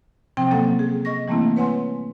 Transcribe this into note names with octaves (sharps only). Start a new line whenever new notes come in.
C3 F3 C4 G5
F#3 A#3 C#4 A4 F#5 A6
G#4
D#5 C#6 A#6
E3 G3 A3 A#3 C4 E4
B4 C#5 F#5 G#5 C6